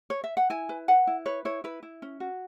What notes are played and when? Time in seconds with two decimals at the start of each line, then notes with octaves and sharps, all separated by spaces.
0.10 C#5
0.24 E5
0.37 F#5
0.50 E4 G#5
0.69 B4
0.88 B4 F#5
1.07 E4
1.25 B4 C#5
1.45 E4 C#5
1.64 E4 B4
1.83 E4
2.02 C#4
2.20 F#4